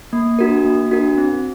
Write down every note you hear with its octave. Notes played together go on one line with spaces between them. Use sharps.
A#3
D4 F#4 A#4
A#3
D4 F#4 A#4
C4